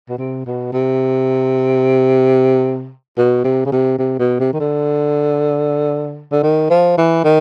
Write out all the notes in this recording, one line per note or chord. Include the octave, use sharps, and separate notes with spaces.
B2
C3
B2
C3
B2
C3
C#3
C3
C3
B2
C3
D#3
D3
D3
D#3
F3
E3
D#3